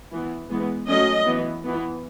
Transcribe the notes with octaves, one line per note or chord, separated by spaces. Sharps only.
E3 B3
E3 G#3 B3
F#3 A3 C#4 D#5
E3 B3
E3 B3